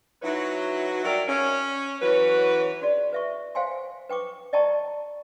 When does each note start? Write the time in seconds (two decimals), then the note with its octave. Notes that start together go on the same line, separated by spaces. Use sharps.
0.22 F#3 D#4 E4 F#4 B4 C#5
1.03 F#3 G3 A#4 D5 E5 F#5
1.28 C#4
2.02 E3 F#3 C#4 F#4 B4
2.82 F#4 G#4 D5
3.13 B4 E5 C#6
3.55 C5 F5 G5 G#5 C6
4.09 B4 G5 C#6 D6
4.53 D5 D#5 G5 A5 A#5 C#6